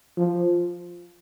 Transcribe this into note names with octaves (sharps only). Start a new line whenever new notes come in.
F3